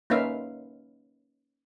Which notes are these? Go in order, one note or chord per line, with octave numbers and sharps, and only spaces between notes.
A#3 C#4 D#4 B4 E5 F5